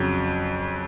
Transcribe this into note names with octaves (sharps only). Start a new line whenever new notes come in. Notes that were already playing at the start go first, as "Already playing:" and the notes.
Already playing: F2 C#3 F#3